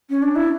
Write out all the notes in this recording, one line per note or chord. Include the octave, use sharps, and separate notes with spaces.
C#4
D4
E4